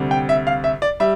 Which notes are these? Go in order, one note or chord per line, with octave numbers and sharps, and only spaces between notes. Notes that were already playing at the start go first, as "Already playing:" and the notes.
Already playing: D2 C3 G3
G5
E5
F5
E5
D5
G3 E5